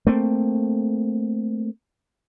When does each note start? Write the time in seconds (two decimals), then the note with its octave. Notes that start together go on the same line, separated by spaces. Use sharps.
0.07 A3 A#3 C4